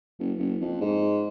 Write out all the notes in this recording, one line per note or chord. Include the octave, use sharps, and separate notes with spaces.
F#1
F#1
F2
G#2